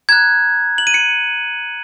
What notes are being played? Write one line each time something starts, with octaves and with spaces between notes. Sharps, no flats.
A#5 F#6 G#6
F#7
D#7
C#7